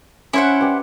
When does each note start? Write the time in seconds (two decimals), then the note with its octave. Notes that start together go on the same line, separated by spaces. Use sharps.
0.33 C#4 E4 C5 F#5
0.61 G4 B4 D5